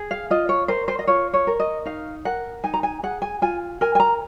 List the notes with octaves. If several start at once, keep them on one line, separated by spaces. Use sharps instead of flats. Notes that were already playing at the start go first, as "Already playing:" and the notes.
Already playing: G#4
F5
F4 D#5
C#5
A#4 C5
C5
D#5
F4 C#5
C#5
A#4
D#5
D#4 F5
A#4 F#5
D#4 G#5
A#5
G#5
G#4 F#5
G#5
F4 G#5
A#4 G#5
G#5
A#5